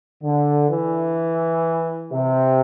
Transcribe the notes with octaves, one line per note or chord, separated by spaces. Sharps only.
D3
E3
C3